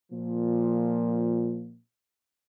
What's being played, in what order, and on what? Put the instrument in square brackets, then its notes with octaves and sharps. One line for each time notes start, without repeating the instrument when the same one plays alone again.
[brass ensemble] A#2 F3